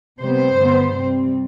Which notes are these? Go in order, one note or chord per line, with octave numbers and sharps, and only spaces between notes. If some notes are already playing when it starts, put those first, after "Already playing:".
C3 G3 B3 C5
G2 D3 F#3 B3
C3 G3 C4